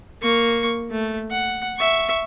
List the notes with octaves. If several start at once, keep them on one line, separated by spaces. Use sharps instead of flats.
A#3 C#6
A3
F#5
E5 C#6